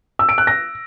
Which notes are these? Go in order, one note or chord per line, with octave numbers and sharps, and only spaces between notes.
E6
D7
F#6
A#6